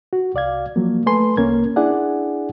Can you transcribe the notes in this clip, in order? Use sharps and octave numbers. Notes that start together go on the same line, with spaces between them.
F#4
C2 D5 F5 G#6
F3 F#3 A#3
A3 A4 B4 G#5 C6
C2 A#3 C#4 A#4 G#6
D4 E4 G#4 D5 F#5 G#5